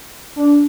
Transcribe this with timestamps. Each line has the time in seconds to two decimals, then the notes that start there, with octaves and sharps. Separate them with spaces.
0.36 D4